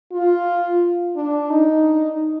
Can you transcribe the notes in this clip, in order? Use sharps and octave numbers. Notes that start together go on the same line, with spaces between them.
F4
D4
D#4